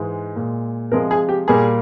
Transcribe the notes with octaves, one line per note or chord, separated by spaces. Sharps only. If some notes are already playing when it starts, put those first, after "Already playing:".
Already playing: G#2 E3 G#3
A#2 G#3
C3 F3 G#3 A#4
G#4
G4
A#2 G3 A#3 G#4